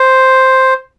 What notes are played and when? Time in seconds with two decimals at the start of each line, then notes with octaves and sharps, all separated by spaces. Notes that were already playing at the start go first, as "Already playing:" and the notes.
Already playing: C5